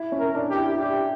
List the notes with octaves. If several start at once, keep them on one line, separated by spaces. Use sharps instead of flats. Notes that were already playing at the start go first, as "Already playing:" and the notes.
Already playing: E4
C#4
A#4
D4
G4
E4
E4 G4